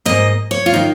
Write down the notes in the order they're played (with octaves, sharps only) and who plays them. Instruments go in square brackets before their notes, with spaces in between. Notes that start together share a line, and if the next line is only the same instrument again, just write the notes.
[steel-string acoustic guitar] G#2 D#3 A#3 D#5
C#5
F4
D#3 A#3 D#4